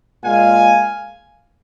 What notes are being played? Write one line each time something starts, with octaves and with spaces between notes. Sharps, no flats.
A#2 G#3 F5 G#5